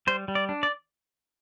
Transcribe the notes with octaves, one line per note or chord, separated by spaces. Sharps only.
G3 C5
G3
D5
D4
D5